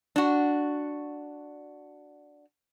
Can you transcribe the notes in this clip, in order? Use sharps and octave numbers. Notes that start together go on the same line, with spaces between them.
D4 F#4